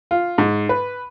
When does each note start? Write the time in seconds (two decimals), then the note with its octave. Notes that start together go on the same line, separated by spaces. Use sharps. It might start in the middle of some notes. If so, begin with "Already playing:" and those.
0.11 F4
0.38 G#2
0.69 B4